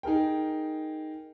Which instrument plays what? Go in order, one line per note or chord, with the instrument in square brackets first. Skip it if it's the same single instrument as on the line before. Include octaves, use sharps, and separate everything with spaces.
[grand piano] D#4 G#4 A#4 G5